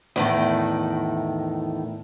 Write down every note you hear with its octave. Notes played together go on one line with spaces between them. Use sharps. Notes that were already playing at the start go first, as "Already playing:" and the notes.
E2 A2 D#3